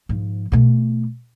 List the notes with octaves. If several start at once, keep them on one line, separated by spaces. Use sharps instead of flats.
G#2 F3
B2 A3